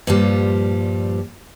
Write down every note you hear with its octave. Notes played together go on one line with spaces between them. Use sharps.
G2 A#2 F3 G3